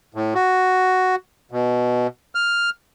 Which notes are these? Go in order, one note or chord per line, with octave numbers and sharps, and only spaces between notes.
A2
F#4
B2
F6